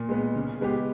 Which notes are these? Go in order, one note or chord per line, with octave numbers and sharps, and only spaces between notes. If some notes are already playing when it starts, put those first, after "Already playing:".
Already playing: A#2
G#3 B3
C#3
G#3 B3 G4